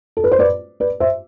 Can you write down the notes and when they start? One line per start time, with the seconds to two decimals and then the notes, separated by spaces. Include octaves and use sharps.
0.17 A4
0.24 B4
0.32 C5
0.39 B4 D5
0.80 B4 D5
1.00 C5 E5